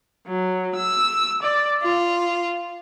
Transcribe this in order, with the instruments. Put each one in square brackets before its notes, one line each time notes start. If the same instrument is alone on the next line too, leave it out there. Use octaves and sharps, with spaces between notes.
[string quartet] F#3
E6
D5
F4